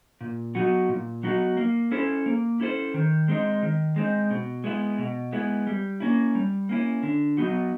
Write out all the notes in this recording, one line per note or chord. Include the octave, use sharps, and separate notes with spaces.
A#2
F#3 B3 D#4 F#4
A#2
F#3 B3 D#4 F#4
A#3
C#4 E4 A4 C5
A#3
C#4 E4 A4 C5
D#3
G#3 C4 D#4
D#3
G#3 C4 D#4
B2
G#3 B3 E4
B2
G#3 B3 E4
G3
A#3 C#4 E4
G3
A#3 C#4 E4
D3
F#3 B3 D#4 F#4